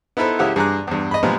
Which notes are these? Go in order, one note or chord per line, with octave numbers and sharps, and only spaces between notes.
B3 D#4 E4 A4 B4 C5
C#2 C#3 E4 G4 F5 F#5
G2 G#4 A#5 D6 F#6
E2 G2
D#5 B5
A#2 F3 G3 G#3 B3